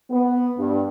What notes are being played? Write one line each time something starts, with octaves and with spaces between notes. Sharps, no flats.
B3
G2